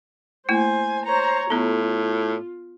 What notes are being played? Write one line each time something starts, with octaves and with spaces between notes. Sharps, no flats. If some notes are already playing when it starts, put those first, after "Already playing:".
A3 A#3 E4 C5 G#5
C5 C#5 A#5
A2 B3 F4 A4